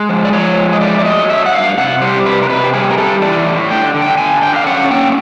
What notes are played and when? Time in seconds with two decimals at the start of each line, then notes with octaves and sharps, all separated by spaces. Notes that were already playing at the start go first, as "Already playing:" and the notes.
Already playing: G#3
0.09 F3
0.25 D5
0.33 F3 C#5
0.57 G#3
0.73 D#5
0.81 A3 D5
0.99 D5
1.05 F#3 D#5
1.29 A3 E5
1.46 F#5
1.53 G2 F5
1.78 C3 F#5
2.01 G3 C5
2.25 C3 B4
2.43 A#4
2.50 C3 B4
2.64 G4
2.74 G3 G#4
2.90 A#4
2.98 G3 A4
3.22 E3 D5
3.46 A2
3.70 D3 G5
3.94 D3
4.02 G5
4.18 D3 G#5
4.42 D3 G5
4.56 F5
4.67 C#4 F#5
4.91 A#3 G5